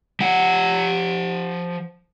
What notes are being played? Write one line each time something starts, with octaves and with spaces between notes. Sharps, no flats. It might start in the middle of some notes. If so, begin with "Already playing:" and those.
F3 F#5